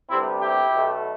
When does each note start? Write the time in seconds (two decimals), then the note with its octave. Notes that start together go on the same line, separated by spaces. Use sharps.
0.10 D2 C3 G3 B3 C4 E4
0.41 E4 G4
0.72 B1 B2 A3